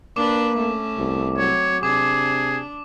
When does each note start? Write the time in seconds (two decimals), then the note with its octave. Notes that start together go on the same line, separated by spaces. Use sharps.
0.16 A#3 D4 B4 D6
0.57 A3 C#4
0.98 C2
1.38 F#3 C4 C#5
1.83 C3 D4 G#4 D6